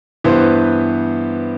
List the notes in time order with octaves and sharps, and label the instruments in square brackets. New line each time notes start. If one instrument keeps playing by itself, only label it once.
[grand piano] G2 E3 B3 C5